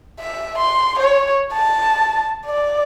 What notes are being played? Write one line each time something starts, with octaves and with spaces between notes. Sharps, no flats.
E5
C6
C#5
A5
D5